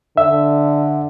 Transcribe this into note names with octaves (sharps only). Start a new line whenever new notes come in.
D3 E5